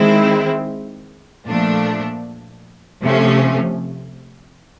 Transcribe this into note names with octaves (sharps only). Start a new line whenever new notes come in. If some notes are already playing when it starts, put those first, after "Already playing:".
Already playing: D#3 G#3 C4 E4
A#2 F3 A3 D4
C3 F3 A3 C#4